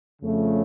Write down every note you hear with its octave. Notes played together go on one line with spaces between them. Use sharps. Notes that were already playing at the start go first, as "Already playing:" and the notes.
F2 C#3 F3 A3 C#4